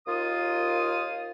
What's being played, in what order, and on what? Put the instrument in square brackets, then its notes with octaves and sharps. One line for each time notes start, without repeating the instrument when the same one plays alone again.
[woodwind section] D#2 A#3 F4 D#6